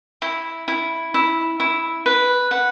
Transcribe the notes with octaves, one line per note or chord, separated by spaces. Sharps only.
E4
E4
E4
E4
B4
B4 F#5